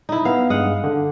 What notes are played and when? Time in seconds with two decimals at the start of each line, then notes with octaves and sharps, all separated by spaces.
0.09 D#4 E4
0.25 B3 F5
0.50 G2 G#3 F5 F#5 D#6
0.84 D3